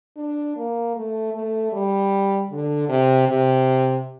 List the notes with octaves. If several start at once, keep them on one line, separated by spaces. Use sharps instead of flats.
D4
A#3
A3
A3
G3
D3
C3
C3